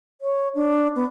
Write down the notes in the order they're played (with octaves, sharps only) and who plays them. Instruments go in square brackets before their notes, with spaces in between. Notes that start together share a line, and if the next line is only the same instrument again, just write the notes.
[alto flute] C#5
D4
B3